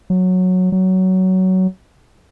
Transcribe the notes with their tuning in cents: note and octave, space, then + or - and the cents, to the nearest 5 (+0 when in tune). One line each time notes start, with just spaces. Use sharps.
F#3 -10
F#3 +15